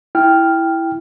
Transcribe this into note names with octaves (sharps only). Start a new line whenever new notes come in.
E4 G5 F6